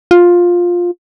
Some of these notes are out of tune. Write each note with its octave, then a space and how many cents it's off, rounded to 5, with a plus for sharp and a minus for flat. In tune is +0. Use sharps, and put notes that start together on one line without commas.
F4 +10